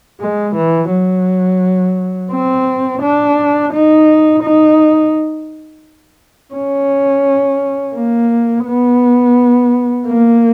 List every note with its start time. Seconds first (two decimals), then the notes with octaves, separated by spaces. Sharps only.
0.21 G#3
0.56 E3
0.91 F#3
2.32 C4
3.02 D4
3.73 D#4
4.43 D#4
6.54 C#4
7.94 A#3
8.66 B3
10.06 A#3